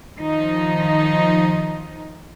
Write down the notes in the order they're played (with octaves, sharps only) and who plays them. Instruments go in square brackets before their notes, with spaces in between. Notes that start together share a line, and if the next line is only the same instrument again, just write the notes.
[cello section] D#3 F3 D#4